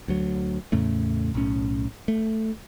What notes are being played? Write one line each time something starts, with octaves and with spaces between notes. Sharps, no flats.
D2 F#3
E2 A2 C#3 A3
B1 A2 C#4
A3